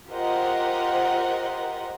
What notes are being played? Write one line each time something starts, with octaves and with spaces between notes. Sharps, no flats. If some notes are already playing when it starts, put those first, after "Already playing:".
F4 G4 A#4 C5 D#5 F#5